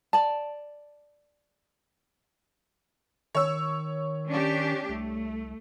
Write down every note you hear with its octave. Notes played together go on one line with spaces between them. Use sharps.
D5 A5
D#3 C#5 E6
C#4 D4 G4
C2 A3